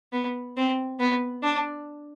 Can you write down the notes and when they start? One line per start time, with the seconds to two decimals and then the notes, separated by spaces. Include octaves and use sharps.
0.12 B3
0.56 C4
0.99 B3
1.43 D4